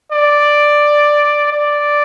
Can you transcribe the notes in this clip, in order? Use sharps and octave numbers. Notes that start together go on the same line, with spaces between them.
D5
D5